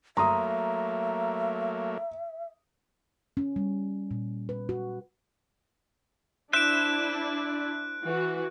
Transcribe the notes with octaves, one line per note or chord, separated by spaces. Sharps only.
F#3 A3 A#3 E5 A#5 C6 D#6
C#4
G3
A#2
B4
F#4
D4 E4 C5 E5 F#6 D7
E3 F#4